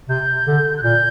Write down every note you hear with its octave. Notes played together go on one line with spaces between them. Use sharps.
C3 G6
D3
F#6
A#2 G6